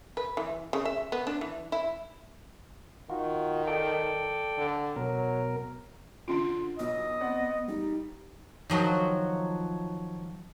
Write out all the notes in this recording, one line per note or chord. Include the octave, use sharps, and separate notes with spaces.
B4
E3
C#3
E5
B3
D4
E3
E4
D#3 F4 F#4
A4 D5 G5
D3
B2 F#3 A#4
D3 C#4 F4 C6 D7
B1 B3 D#5
C4 D5 F#5
G3 D#4
D#3 F3 F#3